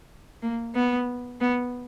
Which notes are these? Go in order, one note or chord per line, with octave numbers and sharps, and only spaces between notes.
A#3
B3
B3